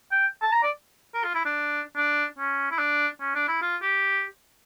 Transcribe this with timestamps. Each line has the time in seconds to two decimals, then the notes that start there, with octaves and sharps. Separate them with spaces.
0.12 G5
0.42 A5
0.52 A#5
0.63 D5
1.14 A#4
1.24 F4
1.35 E4
1.45 D4
1.96 D4
2.39 C#4
2.71 E4
2.79 D4
3.21 C#4
3.35 D4
3.48 E4
3.62 F4
3.82 G4